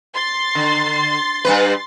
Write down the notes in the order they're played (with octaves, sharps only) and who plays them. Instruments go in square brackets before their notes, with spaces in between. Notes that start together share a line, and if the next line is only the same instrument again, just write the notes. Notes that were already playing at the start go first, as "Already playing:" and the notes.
[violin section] C6 A6
[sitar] D3
G2 B2 B4